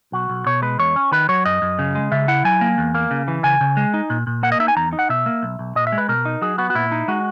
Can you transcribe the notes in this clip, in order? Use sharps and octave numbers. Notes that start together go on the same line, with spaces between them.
B1 F#4
B1
B2 C#5
G#3 B4
E2 C#5
C#4
D#3 B4
F#3 C#5
F#2 D#5
F#2
C#3
G#3
C#3 E5
E4 F#5
F#3 G#5
A#3
E2
A#3
C#3
E3
C#3 G#5
C#3
G#3
D#4
A#2
A#2
A#3 F#5
D#5
D#4 E5
G#5
E2 A#5
D#4
F#5
B2 E5
A#3
B1
B1
A#2 D#5
E5
G#3
B4
B2 A#4
D#4
F#3 G#4
B3 F#4
F#4
A#2 E4
D#4
G#3 F#4